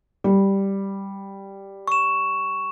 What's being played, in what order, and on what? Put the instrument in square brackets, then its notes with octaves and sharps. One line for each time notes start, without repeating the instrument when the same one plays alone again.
[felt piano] G3
[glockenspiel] C#6 E7